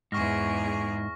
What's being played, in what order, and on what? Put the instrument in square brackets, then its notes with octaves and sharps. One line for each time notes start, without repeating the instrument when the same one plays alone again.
[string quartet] E2 G#4 [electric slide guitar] G#2 [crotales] C#6 F6 A#6